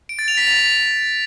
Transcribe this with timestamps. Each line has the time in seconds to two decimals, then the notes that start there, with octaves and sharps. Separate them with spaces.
0.09 D7
0.19 A6
0.28 F7
0.37 B6
0.47 A6